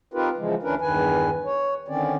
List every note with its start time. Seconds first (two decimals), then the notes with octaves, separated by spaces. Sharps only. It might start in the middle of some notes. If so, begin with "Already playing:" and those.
0.14 C4 D#4 F4 G4 A#4 B4
0.38 C#3 E3 F3 G#3
0.63 D2 E3 C#4 D4 A#4 B4
0.81 E2 G2 D#3 B4 G#5
1.45 C#5
1.88 D3 D#3 C4 C#4 D5